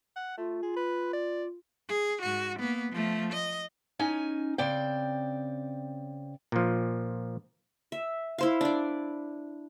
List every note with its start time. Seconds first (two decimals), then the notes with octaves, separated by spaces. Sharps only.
0.16 F#5
0.37 A3 F4
0.62 G#4
0.76 B4
1.13 D5
1.89 G#4
2.22 G#2 F#4
2.58 A#3 B3
2.92 F3 A3
3.32 D#5
3.99 C#4 D#4 G#5
4.58 C#3 C4 D5 G5
6.52 A#2 F3
7.92 E5
8.38 E4 C5 F5
8.61 D4 D5